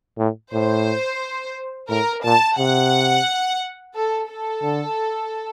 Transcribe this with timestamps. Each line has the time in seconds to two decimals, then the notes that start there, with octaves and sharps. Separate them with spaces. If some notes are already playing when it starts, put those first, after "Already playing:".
0.18 A2
0.53 A2 C5
1.89 A2 A#4
2.24 A#2 A5
2.58 C3 F#5
3.95 A4
4.30 A4
4.63 D3